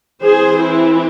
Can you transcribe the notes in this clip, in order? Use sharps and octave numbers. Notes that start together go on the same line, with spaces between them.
E3 C4 G#4 C5
E4